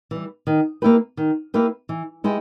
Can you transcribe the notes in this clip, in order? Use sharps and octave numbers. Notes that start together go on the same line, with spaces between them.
E3 G3
D#3
A#3 E4 G4 B4
D#3
A#3 E4 G4 B4
E3
G#3 B3 E4 G4